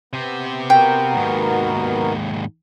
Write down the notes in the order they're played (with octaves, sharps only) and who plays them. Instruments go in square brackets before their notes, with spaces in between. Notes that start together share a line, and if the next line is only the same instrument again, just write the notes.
[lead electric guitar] C3 G4 [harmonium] B3
[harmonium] B3 F#4 A#4 [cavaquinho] G5
[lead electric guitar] D#2 G#2